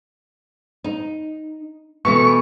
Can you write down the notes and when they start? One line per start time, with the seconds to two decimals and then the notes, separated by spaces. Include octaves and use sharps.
0.84 D#4
2.05 B2 E3 A3 C#6